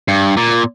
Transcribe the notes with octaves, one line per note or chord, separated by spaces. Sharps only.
G2
A#2